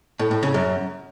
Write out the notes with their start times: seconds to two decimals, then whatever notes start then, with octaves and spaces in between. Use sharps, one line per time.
0.19 A2
0.31 A2
0.43 C#3
0.54 F#2